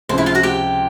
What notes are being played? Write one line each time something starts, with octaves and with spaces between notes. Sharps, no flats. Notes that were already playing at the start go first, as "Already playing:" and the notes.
C#2 C3 F3 C5
E4 E5
F4 F5
F#4 F#5
G4 G5